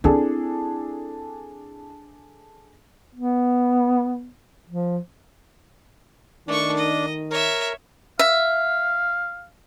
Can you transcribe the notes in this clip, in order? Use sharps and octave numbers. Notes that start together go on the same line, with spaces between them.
C4 D4 E4 G#4 A4
B3
F3
D#3 A3 D4 C#6
D#5
A#4 C#5 E5
E5 F5